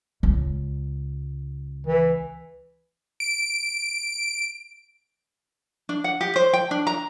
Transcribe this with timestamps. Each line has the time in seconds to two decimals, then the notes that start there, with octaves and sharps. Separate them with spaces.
0.23 C#2
1.87 E3
3.20 D7
5.89 D4
6.04 F#5
6.21 G4
6.36 C5
6.53 G5
6.71 D4
6.87 A#5